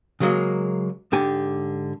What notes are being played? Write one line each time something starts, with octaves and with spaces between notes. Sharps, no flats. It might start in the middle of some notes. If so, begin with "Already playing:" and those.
C#3 F#3 G#3 A#3
G#2 D3 G4 G#5